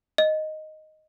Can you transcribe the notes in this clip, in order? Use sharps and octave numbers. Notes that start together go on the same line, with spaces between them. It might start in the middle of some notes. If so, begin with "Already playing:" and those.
D#5